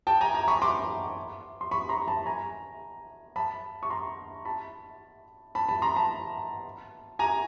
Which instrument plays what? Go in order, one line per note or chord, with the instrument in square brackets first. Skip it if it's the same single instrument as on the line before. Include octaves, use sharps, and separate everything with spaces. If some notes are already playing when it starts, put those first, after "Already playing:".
[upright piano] G5 A5
G#5 A#5
G#5 A#5
B5 C#6
C6 D6
C6
B5 C#6
A#5 C6
A5 B5
G#5 A#5
A5 B5
C#6
A#5 C6
A5 B5
A5 B5
A5 B5
A#5 C6
A5 B5
G#5 A#5